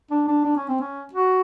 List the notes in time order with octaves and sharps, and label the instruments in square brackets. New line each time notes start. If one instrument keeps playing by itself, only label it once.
[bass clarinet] D4
D4
D4
C#4
C4
C#4
F#4